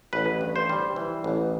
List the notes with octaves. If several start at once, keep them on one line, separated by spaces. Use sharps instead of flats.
A1 B4
G2
C5
G3
E3
A1